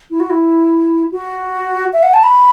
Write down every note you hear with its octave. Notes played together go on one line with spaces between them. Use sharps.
E4
F#4
E4
F#4
E5
F#5
A5
B5